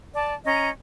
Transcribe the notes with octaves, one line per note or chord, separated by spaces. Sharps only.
D5 A5
C#4 D#5 A#5